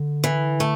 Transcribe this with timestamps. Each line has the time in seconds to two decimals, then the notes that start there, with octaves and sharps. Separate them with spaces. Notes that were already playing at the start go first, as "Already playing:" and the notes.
Already playing: D3
0.24 E3
0.60 A3